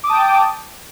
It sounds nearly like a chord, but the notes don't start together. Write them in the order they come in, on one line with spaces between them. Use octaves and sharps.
D6 D#6 A5 G5